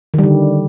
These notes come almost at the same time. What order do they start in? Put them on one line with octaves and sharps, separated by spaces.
D#3 G3 D3